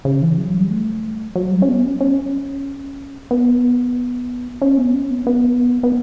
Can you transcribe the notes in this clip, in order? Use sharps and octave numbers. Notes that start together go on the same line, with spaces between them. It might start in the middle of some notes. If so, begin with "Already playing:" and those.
C#3
E3
F#3
G3
A3
F#3
G3
C#4
B3
C#4
C#4
B3
C#4
B3
C#4
B3
C#4
B3
B3